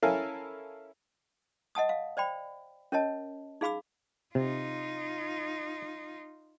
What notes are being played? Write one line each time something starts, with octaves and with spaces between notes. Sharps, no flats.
C#4 E4 A4 A#4 F5 G#5
D#5 F#5 A5 D#6
F5
C5 D5 G5 B5
C#4 A#4 C#5 D#5 A5
D#4 G#4 F5 B5 D6 E6
C3 D#4 F4